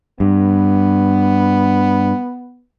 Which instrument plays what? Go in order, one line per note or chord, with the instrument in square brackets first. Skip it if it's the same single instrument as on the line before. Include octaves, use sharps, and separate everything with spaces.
[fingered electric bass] G2 [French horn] B3